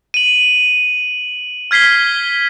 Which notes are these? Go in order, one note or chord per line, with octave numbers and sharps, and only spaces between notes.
D#7 F#7
F6 G#6 B6 C7 G7